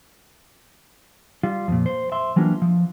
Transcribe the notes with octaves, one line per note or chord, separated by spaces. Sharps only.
G3 F4
F2 A#2
C5
E5 C6
E3 F#3 G3 A#3 D4 F4
F3